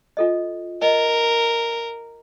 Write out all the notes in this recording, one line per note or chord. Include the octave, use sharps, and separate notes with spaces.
F4 A4 D#5
A#4 D#5